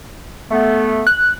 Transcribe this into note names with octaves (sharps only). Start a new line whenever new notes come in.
A3 B3
F#6